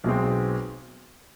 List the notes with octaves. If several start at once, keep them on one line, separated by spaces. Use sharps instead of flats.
B1 B2 G#3 C4